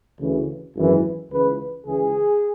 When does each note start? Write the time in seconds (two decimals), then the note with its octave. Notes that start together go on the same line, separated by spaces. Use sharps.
0.18 D2 C#3 E3
0.75 G#1 F#2 E3
1.30 C#2 C#3 E3 B4
1.85 C#2 C#3 E3 G#4